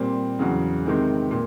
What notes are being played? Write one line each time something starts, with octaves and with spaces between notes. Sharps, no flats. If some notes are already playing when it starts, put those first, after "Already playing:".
Already playing: A#2 G3 C4
E2 C#3 F#3
C3 D#3 G#3 C4
A#2